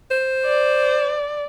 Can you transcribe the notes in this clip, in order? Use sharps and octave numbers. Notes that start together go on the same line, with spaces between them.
C5
D5